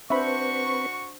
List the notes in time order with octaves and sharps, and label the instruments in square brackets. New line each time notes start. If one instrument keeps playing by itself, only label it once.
[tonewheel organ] C4 B4 [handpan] D4 C5 [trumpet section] F#4 C#6 [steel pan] E5 B5